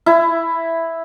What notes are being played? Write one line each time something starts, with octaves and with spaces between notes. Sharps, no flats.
E4